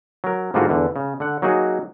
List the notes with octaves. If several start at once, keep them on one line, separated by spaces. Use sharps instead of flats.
F#3 A#4
G#2 D3 G3 A#3 F4 F#4
E2 D3
C#3
D3 F#5
F#3 A#3 D#4 F#4 G#4